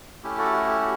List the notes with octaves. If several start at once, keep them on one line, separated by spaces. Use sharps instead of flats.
A3 C#4 E4 G4
F#4 A4
F#4
G4
F#4